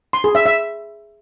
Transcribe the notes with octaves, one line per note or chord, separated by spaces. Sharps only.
C6
G#4
E5
E5